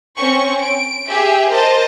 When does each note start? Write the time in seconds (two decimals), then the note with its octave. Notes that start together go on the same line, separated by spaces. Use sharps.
0.16 C4 C#4 C#6
0.61 D7
1.09 G4 G#4 E5
1.50 A#4 C5 D#5 A5